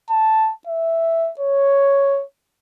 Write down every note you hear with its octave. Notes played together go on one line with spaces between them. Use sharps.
A5
E5
C#5